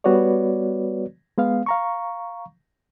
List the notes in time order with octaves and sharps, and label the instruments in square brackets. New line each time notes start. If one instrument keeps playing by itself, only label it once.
[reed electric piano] G3 B3 F#4 B4 C#5 D5
G#3 B3 F5
F5 A#5 C#6